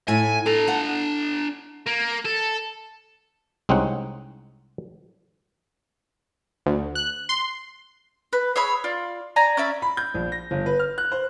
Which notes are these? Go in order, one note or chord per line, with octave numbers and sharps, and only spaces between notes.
A2 E4 G#5
D4 A4 A#5
F#5 A5
A#3
A4
C2 G#3 C4 C#4 D#4 F#5
D2
F#6
C6
B4
G#4 C#5 E5 B5
F4 D5
D5 G#5 A#5
C#4 D5 E5 B5
B5
G6
A#1
A#6
G1
B4
F6
F#6
C5